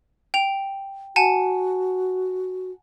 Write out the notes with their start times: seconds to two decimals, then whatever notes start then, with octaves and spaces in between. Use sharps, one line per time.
0.34 G5 F7
1.16 F#4 F#5 G#5 A5